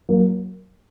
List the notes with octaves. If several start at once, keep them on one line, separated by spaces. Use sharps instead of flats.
F#3 A#3